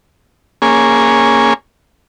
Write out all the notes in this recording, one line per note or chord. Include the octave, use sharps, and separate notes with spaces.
A#3 C#4 G#4